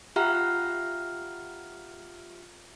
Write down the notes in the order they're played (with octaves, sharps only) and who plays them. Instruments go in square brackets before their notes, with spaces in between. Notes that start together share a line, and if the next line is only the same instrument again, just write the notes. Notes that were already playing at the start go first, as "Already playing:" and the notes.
[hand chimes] F4 G4 E5 F#5 A#5 F6